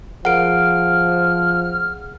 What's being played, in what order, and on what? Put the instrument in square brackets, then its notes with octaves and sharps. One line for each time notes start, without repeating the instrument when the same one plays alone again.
[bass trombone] F3 [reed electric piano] G#4 A#4 F5 [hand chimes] F#5 D7 [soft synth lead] F6